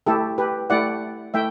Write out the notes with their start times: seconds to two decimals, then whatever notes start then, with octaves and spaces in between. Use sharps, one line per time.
0.06 A3 E4 G4 A4
0.38 G4 B4
0.70 A3 E4 G4 D5 F#5
1.34 A3 E4 E5 G5